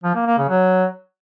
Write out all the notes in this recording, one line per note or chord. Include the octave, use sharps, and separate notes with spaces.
F3
A#3
A#3
C#3
F#3